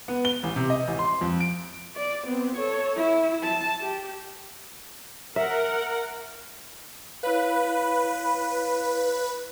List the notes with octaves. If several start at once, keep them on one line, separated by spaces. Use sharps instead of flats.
B3
G7
A1
C3
D#5
A1
C6
F2
D7
D5
B3 C4
A4 C#5
E4
A5
G4
A#4 E5 F#5
E4 B4 C#5 F5